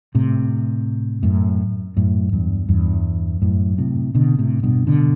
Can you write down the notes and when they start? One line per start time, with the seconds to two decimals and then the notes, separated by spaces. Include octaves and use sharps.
0.15 A2 C3
1.23 F#2 A2
1.97 F#2 A2
2.33 E2 G2
2.68 E2 G2
3.42 F#2 A2
3.78 A2 C3
4.15 B2 D3
4.39 A2 C3
4.63 G2 B2
4.87 B2 D3